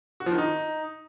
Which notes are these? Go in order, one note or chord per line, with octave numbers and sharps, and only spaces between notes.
F#4
F3
D#3
D#4